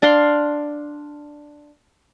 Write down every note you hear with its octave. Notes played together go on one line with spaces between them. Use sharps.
D4 D5 F5 C6